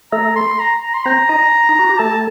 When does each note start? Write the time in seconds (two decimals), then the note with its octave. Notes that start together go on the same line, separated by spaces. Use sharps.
0.12 A3 A4 A#5
0.36 C6
0.60 A#5
0.83 A#5
0.94 C6
1.05 C4 C5 A#5
1.29 D#4 D#5
1.69 D#4
1.79 F#4
1.89 G4
1.99 A3 A4 A5